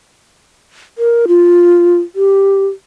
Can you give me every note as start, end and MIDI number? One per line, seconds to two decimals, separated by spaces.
0.98 1.26 70
1.28 1.98 65
2.16 2.65 67